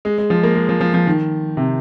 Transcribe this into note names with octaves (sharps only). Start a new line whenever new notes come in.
G#3
G#3
F3
A#3
G#3
F3
F3
F3
D#3
C3